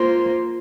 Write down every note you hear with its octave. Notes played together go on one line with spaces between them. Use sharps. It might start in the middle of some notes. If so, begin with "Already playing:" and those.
Already playing: A#3 F4 C5